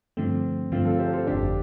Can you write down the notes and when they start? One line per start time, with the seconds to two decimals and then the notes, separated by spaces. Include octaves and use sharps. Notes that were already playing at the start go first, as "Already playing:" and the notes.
0.17 G2 D3 F3 A3 C4
0.72 G2 D3 F3 A3 C4 F4
0.85 F4 A4
0.99 G4 C5
1.13 F4 A4
1.27 G1 F2 D3 D4 G4